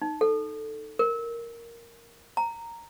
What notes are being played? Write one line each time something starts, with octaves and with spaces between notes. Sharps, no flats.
D#4
A4
A#4
A#5